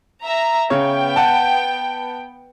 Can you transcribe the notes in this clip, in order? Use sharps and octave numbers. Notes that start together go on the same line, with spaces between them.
E5 A#5
C#3 B3 C#5 G5
F#5 A5